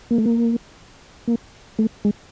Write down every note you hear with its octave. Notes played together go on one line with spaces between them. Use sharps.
A#3
A3
A#3
A#3
A3
G#3